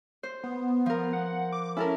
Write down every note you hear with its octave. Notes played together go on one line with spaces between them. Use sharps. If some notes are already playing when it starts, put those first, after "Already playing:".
C5
B3
F3 A#4
F#5
D6
C#4 E4 A4 A#4